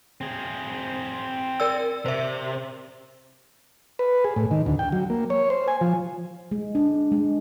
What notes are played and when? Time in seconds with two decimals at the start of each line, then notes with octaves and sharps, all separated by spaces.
0.21 C4 G#4
1.60 A#4 D5 E6
2.06 C3 C5 E5
3.99 B4
4.25 G#4
4.36 A2
4.51 D#3
4.66 D2
4.79 G5
4.92 F#3
5.10 A#3
5.30 C#5
5.50 C5
5.68 G#5
5.81 F3
6.51 G#3
6.75 D4
7.12 G#3